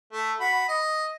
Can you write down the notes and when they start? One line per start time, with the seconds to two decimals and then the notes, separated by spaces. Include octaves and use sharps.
0.13 A3
0.40 F#4 B5
0.68 D#5